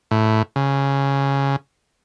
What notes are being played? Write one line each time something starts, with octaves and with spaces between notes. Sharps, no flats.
A2
C#3